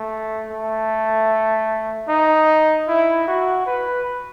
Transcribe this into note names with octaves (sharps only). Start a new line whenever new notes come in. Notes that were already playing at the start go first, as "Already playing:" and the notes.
Already playing: A3
A3
D#4
E4
F#4
B4